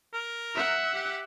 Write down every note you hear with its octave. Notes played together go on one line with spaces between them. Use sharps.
A#4
E5 F#5
G4